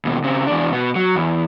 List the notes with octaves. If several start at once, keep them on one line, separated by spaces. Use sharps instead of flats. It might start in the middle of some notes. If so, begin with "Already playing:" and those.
D#2 B2
C#3 C4
E2 D4
B2 B3
F#3
E2